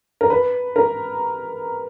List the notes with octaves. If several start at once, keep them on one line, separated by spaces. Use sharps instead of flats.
A#4
B4
A#4